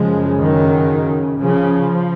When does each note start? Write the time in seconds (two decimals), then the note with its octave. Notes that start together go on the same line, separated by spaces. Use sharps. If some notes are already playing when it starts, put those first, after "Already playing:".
Already playing: F#2 C#3 F3 G#3
0.40 D#3 F#3
1.38 C#3 F3